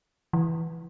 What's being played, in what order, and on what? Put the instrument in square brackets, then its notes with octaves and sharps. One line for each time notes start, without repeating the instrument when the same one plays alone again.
[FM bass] E3